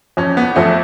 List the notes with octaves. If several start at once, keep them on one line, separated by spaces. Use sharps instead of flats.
F2 C#4
B3
F2 A3